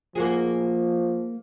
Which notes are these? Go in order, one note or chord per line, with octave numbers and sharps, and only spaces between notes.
F3 A#3 F#4 G#4